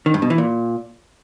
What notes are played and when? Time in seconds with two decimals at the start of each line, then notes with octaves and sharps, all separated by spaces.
0.06 D#3
0.14 G2
0.22 B2
0.30 E3
0.38 A#2